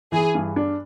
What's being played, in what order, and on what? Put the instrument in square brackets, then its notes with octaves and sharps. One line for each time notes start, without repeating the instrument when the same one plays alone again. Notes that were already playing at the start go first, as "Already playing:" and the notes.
[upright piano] E3 [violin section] G#4
[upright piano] G2
D4